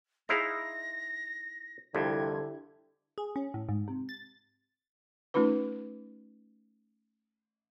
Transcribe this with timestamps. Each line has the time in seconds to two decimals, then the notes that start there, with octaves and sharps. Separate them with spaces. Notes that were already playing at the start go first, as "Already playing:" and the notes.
0.29 D#4 E4 G#4 C5 F5 A#6
1.94 C2 F2 D3 E4 G4 D5 G#6
3.18 G#4
3.36 C#4
3.54 A2
3.69 G#2
3.88 C3
4.09 A6
5.34 A3 C#4 D#4 F4 B4